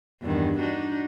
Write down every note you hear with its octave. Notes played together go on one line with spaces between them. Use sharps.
E2 G2 D#3
D4 D#4 F#4